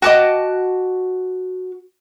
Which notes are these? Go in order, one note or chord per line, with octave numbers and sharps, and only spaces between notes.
F#4 D#5 G5 A5 D6